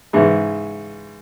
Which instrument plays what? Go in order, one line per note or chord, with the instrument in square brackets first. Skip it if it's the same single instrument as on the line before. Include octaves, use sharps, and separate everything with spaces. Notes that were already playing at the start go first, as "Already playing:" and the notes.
[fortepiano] G#2 C#3 E3 G#3